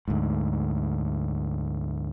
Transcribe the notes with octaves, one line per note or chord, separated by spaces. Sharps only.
D2 G#2